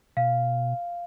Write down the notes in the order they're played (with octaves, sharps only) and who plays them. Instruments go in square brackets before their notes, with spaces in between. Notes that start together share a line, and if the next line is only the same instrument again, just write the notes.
[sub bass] B2 [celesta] F5